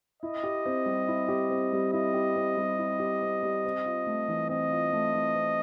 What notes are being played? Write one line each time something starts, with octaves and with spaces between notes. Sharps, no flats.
E4 D#5
G4
C4
G3
E4
G4
C4
G3
E4 D#5
G4
C4
G3
E4
G4
C4
G3
C4
F4
A3
E3
C4 D#5
F4
A3
E3
C4